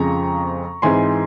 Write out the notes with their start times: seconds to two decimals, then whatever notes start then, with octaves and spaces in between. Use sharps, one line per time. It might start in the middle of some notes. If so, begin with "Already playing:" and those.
Already playing: F2 C#3 F3 G#3 C4 A#5 C#6
0.82 G#2 E3 G#3 C4 G#5 C6